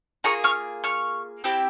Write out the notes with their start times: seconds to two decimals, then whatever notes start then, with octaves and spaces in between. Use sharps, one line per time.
0.24 A#3 F4 G#4 A#5 C#6
0.44 C#6 F6
0.84 C#6 F6
1.44 C4 E4 G4